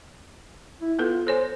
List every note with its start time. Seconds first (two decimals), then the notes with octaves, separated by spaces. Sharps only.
0.81 E4
0.99 B3 F4 A4 B4
1.27 A4 C5 C#5 G#5